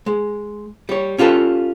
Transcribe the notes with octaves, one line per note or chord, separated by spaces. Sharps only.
G#3
G3 C#5
C#4 F4 G4 A4 B4